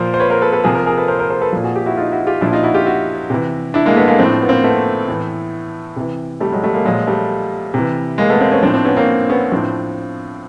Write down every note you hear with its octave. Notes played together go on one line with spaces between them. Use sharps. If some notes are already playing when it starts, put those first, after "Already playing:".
Already playing: A#2 F3 A#4 C5
C5
B4 C#5
A#4 C5
A4 B4
A4 B4
C3 F3 G#4 A#4
G#4 A#4
G#4 A#4
A4 B4
A#4 C5
A#4 C5
A#4 C5
A4 B4
A#2 F3
F#4 G#4
G4
E4 F#4
D#4 F4
E4 F#4
F4 G4
A#2 F3 D4 E4
D#4 F4
E4 F#4
F4 G4
E4 F#4
C3 E3
D4 E4
G#3 A#3
A3 B3
G#3 A#3
A2 F3 C4 D4
B3
A#3 C4
A3 B3
A2 E3
C3 E3
G3 A3
F#3 G#3
G3 A3
G#3 A#3
A#2 F3 F#3 G#3
G3 A3
C3 E3
G#3 A#3
A3 B3
A#3 C4
B3 C#4
A2 F3 C4 D4
C4 D4
B3 C#4
A#3 C4
B3 C#4
A2 F3 C4 D4